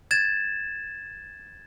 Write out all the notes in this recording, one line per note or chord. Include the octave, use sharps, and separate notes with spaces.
G#6 A6 E7